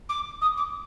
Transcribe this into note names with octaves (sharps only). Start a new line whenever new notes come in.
D6
D#6
D6